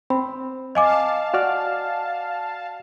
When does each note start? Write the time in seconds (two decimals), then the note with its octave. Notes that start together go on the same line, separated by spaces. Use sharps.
0.10 C4 B5
0.75 D#5 F5 G#5 A5 D6
1.34 F#4 D5 F6